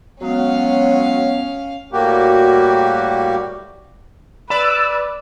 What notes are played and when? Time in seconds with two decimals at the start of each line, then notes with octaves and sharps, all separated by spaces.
0.21 F#3 G#3 B3 C#4 F5
1.93 A2 G3 A#3 F#4 G4
4.50 B4 D5 B5 E6